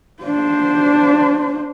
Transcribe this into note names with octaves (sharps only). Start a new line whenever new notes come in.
D4 C5